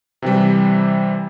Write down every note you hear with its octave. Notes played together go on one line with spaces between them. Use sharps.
C3 E3 G3